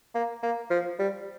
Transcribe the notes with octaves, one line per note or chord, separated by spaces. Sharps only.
A#3
A#3
F3
G3